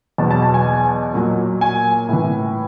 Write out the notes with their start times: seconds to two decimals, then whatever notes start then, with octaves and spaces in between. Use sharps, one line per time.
0.18 E2 B2 F#3 A5
0.31 A5
0.42 A5
0.54 G#5
1.14 A#2 F#3
1.61 G#5
2.09 A2 E3